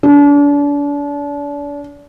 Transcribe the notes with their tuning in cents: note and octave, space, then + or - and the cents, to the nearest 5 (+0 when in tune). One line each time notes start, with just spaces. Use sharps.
D4 -35